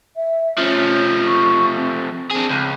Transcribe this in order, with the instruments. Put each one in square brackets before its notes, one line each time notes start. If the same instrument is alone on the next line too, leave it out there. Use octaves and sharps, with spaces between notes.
[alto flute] E5
[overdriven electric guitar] F3 A3 [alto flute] C#4
[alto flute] C#6
C4
[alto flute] C4 [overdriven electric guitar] D4 G#4
[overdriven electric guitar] C#2